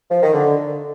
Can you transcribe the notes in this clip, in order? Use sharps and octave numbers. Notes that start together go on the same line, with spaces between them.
F3
D#3
D3